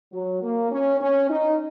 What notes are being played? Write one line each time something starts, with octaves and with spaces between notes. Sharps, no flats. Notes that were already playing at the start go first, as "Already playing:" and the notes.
F#3
A#3
C#4
C#4
D#4